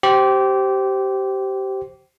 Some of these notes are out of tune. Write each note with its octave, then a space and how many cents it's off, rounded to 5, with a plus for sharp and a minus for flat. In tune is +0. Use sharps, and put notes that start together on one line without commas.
G4 -20 C5 +0